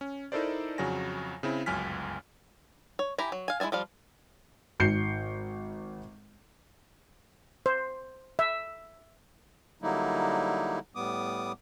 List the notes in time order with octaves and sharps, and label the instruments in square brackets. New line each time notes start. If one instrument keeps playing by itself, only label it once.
[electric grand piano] C#4
D#4 E4 A4 A#4 C5 D5
F2 C#3 F#3 F#4 G#5 A#6
C#3 C4 E4
G1 C#2 F#2 G#5 F6 B6
[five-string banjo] C#5
E4 G4 G#5 A#5
F#3
F5 G#5
G#3 E4 D5 G#5 A5
F3 G3 F5
[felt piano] G#1 G6 C7 C#7
[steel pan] C5
E5
[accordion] D3 F#3 G3 A#3 D#4 E4
A2 G3 B3 D6 D#6